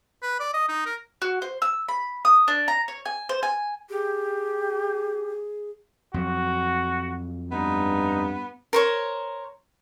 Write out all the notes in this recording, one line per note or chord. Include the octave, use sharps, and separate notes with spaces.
B4
D5
D#5
D#4
A#4
F#4
C5
E6
B5
D#6
D4
A#5
C#5
G#5
C5
G#5
G4 G#4
F2 F#3 F#4
G2 B3 D#4
A#4 C5 C#5